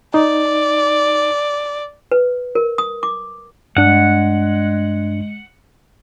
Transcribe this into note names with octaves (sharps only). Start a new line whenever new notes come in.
D#4 D5
B4
A#4
D#6
D6
G2 G#3 D4 F#5